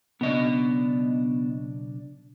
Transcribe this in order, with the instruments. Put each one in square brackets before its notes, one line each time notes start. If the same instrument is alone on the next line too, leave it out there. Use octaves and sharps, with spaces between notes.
[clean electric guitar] B1 C#3 D4 [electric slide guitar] B3 D#5